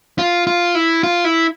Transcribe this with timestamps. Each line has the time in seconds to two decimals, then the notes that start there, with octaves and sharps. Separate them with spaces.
0.19 F4
0.47 F4
0.75 E4
1.03 F4
1.24 E4